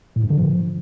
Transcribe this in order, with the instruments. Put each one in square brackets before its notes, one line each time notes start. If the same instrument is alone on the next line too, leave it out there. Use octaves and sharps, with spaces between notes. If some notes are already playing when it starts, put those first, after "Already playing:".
[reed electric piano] A2
G2
D3
F3